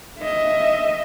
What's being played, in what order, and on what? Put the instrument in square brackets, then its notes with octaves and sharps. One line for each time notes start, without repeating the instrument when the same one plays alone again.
[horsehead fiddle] D#5 E5